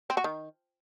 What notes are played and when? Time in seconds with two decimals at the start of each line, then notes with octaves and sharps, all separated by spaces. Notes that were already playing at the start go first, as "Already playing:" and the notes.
0.10 C4
0.17 F#4
0.24 D#3